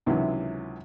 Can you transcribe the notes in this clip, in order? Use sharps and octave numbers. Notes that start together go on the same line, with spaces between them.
C#2 C3 D#3 E3 F#3